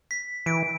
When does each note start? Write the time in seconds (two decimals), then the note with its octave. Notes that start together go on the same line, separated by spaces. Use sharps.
0.11 B6
0.46 E3 D7